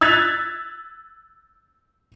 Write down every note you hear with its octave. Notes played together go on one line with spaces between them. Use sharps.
E6 F#6 G#6 A6 B6 F7